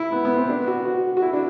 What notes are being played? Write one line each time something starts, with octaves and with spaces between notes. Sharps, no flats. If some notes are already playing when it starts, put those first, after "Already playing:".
Already playing: E4
B3
B3
C4
D4
F#4
F#4
F#4
E4
D4